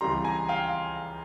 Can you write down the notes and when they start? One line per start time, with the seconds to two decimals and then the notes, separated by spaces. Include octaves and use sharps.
0.01 C#2 C3 E3 G3 A#5 C6
0.24 G#5 A#5
0.48 F5 G5